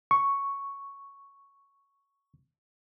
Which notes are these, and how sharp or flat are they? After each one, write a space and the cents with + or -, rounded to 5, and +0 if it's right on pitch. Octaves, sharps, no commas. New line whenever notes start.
C#6 +0